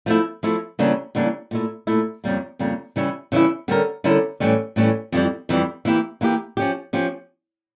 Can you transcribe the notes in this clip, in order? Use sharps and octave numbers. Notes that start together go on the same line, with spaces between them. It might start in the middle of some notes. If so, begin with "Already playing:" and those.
F3 A3 E4
F3 A3 E4
C#3 E3 G3 A#3 D4
C#3 E3 G3 A#3 D4
A#2 A3 E4
A#2 A3 E4
F2 C#3 G3 A#3
F2 C#3 G3 A#3
C#3 E3 G3 C#4 E4
C#3 E3 G3 C#4 E4
D3 G3 C#4 E4 A#4
D3 G3 C#4 E4 A#4
A2 E3 G3 C#4
A2 E3 G3 C#4
F2 E3 G3
F2 E3 G3
E3 A#3 E4 G4
E3 A#3 E4 G4
F3 C#4 G4
F3 C#4 G4